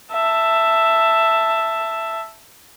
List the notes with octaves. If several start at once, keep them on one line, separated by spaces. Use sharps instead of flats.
E5 A5